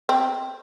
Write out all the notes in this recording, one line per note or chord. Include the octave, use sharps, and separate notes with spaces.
C4